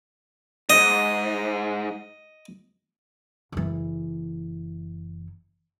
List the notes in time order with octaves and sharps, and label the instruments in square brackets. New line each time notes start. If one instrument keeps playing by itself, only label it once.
[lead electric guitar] D2 G#2 [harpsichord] D#5
[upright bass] F#1 E3